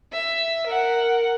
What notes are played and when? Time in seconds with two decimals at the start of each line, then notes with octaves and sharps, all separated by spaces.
0.12 E5
0.66 A#4 F#5